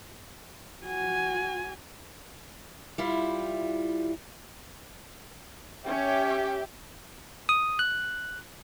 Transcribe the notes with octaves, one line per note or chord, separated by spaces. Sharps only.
F#4 G#5
G3 E4 F4
C#4 G4 C#5 E5
D#6
F#6